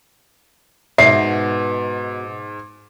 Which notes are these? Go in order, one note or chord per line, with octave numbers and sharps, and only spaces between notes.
G#2 B2 B3 E5 C7